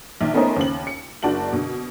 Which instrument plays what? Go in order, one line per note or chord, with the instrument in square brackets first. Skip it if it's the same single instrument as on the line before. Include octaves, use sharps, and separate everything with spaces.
[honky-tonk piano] A#1 D#3
A3 B3 C#4 D#4 A#4 C5
D#2 C#3 F#7
C#7
F#1 D4 F#4 A5 F#7
B2 D3